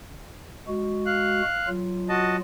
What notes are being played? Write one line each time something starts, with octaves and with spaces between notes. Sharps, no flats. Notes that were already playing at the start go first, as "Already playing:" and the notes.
G#3 F#4
F5 F#6
F#3 F4
F#4 D#5 A5